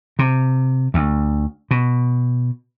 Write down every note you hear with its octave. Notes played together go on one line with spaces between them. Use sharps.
C3
D2
B2